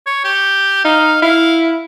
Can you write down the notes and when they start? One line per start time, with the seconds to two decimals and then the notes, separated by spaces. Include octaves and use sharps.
0.06 C#5
0.24 G4
0.84 D#4 F5
1.22 E4 F5